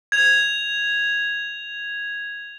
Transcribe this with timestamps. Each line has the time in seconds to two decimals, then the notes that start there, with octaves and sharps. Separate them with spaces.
0.12 G#6 F7